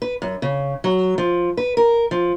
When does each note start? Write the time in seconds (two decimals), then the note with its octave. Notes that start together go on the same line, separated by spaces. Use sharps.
0.02 B4
0.22 F#2
0.42 C#3
0.84 F#3
1.18 F3
1.57 B4
1.77 A#4
2.11 F3